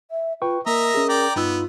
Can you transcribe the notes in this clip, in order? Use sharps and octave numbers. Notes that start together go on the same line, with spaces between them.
E5
F4 B4 G5 C#6
A#3 A#4 D#5 E5 A#5
C#4 G#4
D5 G5 A#5
G2 B3 D#4 F4 E6